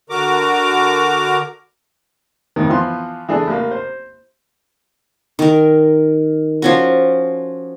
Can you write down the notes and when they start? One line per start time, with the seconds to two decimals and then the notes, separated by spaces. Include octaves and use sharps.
0.10 D3 F#4 A#4 A#5 D6
2.56 F2 A2 D#3
2.69 E3 F3 B3 C6
3.29 E3 D4 G#4 A4
3.47 A1 A#3
3.71 C5
5.39 D#3 A#4
6.62 F3 C#4 F#4